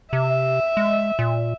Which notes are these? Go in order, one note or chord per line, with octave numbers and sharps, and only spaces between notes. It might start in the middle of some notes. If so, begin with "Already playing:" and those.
C3 E5
G#3
A#2